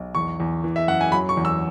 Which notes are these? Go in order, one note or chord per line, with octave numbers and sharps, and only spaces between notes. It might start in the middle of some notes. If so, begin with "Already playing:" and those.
Already playing: B1
E2 C#6
E2
E3
E5
F#2 F#5
G#5
F#3 B5
C#6
E2
E6